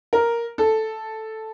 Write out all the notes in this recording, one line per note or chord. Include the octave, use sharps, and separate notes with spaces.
A#4
A4